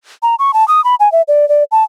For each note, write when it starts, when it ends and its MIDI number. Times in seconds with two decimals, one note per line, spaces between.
0.23 0.35 82
0.39 0.54 85
0.54 0.67 81
0.68 0.83 87
0.84 0.95 83
1.00 1.11 80
1.12 1.22 76
1.28 1.48 74
1.49 1.64 74
1.72 1.84 81